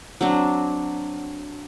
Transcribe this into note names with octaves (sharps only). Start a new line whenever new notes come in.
F#3 C4 D4